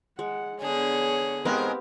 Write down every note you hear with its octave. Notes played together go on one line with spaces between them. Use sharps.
G#3 F#5
D3 B3 G#4 C#5
G#2 G#3 B3 C4 G4 A#4 B4 F5